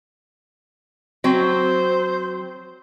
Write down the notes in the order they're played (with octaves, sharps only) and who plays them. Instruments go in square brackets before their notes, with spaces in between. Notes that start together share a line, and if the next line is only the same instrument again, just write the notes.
[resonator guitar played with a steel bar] F#3 C4 [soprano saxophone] C5